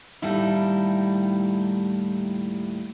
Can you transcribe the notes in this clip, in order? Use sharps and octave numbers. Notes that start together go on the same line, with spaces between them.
D#2 A2 G3 D#4 E4